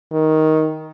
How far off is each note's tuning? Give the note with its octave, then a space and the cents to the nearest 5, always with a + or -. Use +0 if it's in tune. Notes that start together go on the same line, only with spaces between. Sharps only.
D#3 +10